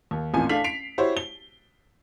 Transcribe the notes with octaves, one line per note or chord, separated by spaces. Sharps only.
D#2
A1 F2 A#2 G#5
A3 D4 F5 B6 F#7
B6 C7 D7 F7
E4 F#4 G4 C5 C#5
G7